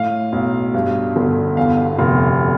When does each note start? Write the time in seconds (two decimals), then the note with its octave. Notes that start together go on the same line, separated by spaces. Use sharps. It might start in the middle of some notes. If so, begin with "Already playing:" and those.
Already playing: A2 F5
0.32 B1
0.74 G2
1.16 G1
1.57 E2 F5
1.99 F1